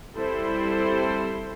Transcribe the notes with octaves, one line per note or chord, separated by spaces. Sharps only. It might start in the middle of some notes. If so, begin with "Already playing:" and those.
G3 C4 E4 A4 C5